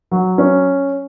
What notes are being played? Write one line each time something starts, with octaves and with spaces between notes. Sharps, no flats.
F#3
C#4